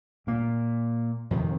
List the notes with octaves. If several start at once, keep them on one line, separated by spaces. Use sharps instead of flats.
A#2 A#3
F2 C3 D#3